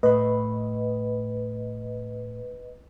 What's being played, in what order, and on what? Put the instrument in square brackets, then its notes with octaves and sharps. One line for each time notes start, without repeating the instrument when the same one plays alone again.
[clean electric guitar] A2 B5 [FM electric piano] B4 D#5